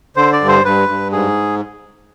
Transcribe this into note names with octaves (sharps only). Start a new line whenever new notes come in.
D3 C5
D5
G2
C5
G2 B4
G2
G#2 G#4